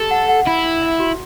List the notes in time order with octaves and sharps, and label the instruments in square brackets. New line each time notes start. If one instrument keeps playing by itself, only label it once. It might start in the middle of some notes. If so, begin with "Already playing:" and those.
Already playing: [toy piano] G4 [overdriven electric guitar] A4
[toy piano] F#5
F#5
[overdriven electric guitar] E4 [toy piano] E5
[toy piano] D4
E5
F#4